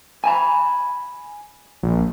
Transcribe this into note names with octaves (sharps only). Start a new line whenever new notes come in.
G#5 A5 B5
A#1